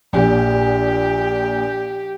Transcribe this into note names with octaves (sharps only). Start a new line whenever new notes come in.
A#1 A#2 G4